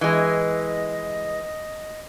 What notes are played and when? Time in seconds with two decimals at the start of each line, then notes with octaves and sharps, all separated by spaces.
0.01 E3 G#3 D#5